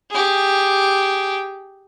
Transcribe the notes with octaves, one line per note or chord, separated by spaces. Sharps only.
G4 G#4